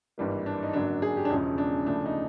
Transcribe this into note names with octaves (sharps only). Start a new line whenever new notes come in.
G#1 G2 E3 G3 A#3
D4
D#4
G#1 F#2 D3 F#3 A#3 D4
G#4
G4
D4
E1 E2 C#3 F3 G#3 C#4
D4
E1 D2 C#3 F3 A3 D4
D#4